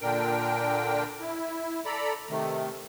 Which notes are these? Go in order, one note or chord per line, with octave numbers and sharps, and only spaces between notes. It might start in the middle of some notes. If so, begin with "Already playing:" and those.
A#2 D3 D4 A#4 G5
E4
A4 D5 A#5 B5
C3 D#3 A3